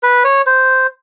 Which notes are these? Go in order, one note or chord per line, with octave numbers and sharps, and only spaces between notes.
B4
C#5
C5